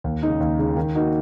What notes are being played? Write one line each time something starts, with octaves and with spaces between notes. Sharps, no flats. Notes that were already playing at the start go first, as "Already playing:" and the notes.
D#2
C#3 G#3 D#4
D#2
C#3 G#3 D#4
D#3
A#3 D#4 F#4